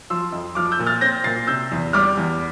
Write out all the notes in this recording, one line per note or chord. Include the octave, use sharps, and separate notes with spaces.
F3 C6 E6
F2
F3 D6 F6
E6 G6
A#2
F6 A6
C4 G6 A#6
A#2 A6 C7
C3 E6 G6
E2
G3 D6 F6
E2